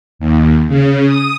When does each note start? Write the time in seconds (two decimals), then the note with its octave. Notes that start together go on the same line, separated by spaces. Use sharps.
0.19 D#2
0.68 C#3
1.06 D#6